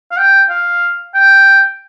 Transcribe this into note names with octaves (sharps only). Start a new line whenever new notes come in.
F5
G5
F5
G5